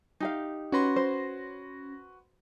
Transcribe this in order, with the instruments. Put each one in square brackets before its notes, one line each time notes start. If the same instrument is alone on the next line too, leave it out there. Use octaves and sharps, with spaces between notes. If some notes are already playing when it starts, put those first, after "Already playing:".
[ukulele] D#4 G4 F5
[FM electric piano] C#4 A#6 [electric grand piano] F#4 B4 C6
[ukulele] C5